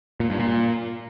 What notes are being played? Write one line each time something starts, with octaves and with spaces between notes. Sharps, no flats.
A#2
G2
A#2